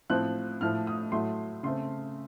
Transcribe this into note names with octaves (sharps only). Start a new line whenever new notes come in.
A2 F3 C4 F#6
A2 F3 A3 F6
D#6
A2 F#3 A3 C6
C#3 A3 C4 C6